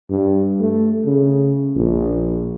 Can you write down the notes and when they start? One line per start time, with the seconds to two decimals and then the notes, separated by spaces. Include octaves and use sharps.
0.10 G2
0.61 A3
1.06 C#3
1.76 A#1